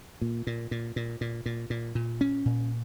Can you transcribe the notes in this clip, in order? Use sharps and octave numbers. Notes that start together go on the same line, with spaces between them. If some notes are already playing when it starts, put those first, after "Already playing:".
A#2
A#2
A#2
A#2
A#2
A#2
A#2
A#2
C#4
A#2